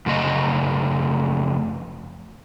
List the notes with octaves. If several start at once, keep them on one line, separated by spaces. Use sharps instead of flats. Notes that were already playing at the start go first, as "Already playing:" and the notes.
F#2 C#3 A3 D#5